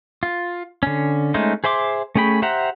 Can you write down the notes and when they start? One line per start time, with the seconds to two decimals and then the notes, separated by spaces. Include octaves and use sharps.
0.23 F4
0.83 D3 C#4
1.34 G#3 A3 C#4 D#4 C5
1.64 G#4 C5 E5 C6 D6
2.15 A3 C#4 G#4 G5 B5
2.42 G4 C5 E5 F#5 A#5